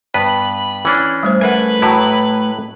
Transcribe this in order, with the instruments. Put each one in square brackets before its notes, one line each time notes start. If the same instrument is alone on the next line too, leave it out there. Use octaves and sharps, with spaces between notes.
[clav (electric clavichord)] G2 B3 B4 [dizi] B5
[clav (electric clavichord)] E3 C#4 D4
[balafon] G3 A3 C5
[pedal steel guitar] A3 G#5 [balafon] A#4 E5 F#5 [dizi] B4
[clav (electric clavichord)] A2 F#3 E4 [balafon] F#4 A5